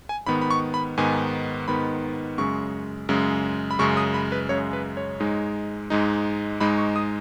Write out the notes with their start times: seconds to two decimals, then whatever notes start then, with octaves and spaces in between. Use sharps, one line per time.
0.09 G#5
0.27 G#2 D#3 B3 B5
0.41 B5
0.51 C#6
0.74 B5
0.97 G#2 D#3 B3 G#5
1.68 G#2 D#3 B3 B5
2.38 F#2 C#3 G#3 C#6
3.09 F#2 C#3 G#3
3.71 B5
3.79 F#2 C#3 G#3 C#6
3.97 D#6
4.14 B5
4.32 B4
4.49 F#2 C#3 G#3 C#5
4.73 B4
4.97 C#5
5.20 G#2 G#3 D#4
5.90 G#2 G#3 D#4
6.60 G#2 G#3 D#4 B5
6.78 C#6
6.96 D#6